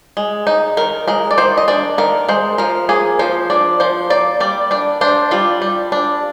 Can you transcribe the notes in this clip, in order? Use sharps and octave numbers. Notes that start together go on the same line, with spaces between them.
G#3
D#4
D#3 A#4
G#3 A#4
D5
D#3 C5
D#5
D4 D5
D#3 A#4
G#3 C5
F3 A#4
A#3 G#4
F3 C5
D4 D5
F3 C5
A#3 D5
G3 D5
D4 D5
D4 C5
G3 F4
G3
D4